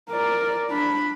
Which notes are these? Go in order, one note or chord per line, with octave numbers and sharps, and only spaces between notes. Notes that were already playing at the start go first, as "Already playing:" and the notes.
A#4 D5
D4 B5